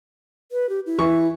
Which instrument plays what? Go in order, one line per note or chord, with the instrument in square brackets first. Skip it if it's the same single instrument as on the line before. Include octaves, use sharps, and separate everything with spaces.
[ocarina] B4
G4
E4
[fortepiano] E3 C#6